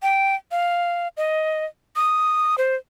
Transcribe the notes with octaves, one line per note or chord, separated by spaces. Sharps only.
G5
F5
D#5
D#6
C5